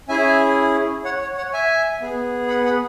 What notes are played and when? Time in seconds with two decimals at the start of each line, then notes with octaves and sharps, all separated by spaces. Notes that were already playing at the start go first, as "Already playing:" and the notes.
0.08 C#4 E4 G#4 E5 G#5
1.04 C#5 F#5
1.21 C#5
1.37 C#5 F#5
1.53 E5 G#5
2.01 B3 G#4
2.49 F#5 B5
2.65 F#5 B5